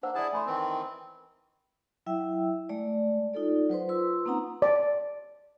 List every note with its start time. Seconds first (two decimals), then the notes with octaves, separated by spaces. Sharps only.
0.03 A#3 D4 C5 F#5 E6
0.15 E4 G#4 D5 F#5 A5
0.33 A3 G#5 B5 C6
0.47 D#3 E3 C4
2.06 F#3 E4 E5 G5 E6
2.69 G#3 A3 D5
3.34 D#4 F4 A4 D5
3.70 F#3 B4 C5 C6
3.89 F4 B4 C6 E6
4.26 A#3 C4 C#4 D#4 F#5 A#5
4.62 D5